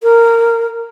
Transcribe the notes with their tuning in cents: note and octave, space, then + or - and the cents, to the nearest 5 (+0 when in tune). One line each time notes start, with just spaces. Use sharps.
A#4 -15